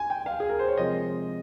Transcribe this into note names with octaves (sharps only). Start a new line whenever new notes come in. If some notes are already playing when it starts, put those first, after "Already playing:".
Already playing: G#5
G5
F5
G#4
A#4
C5
C#5
C3 F3 G#3 D#5